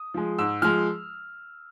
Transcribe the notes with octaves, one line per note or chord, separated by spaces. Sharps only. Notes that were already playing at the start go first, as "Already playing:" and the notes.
Already playing: D#6
F3 G#3
G#2 E6
F3 G#3 F6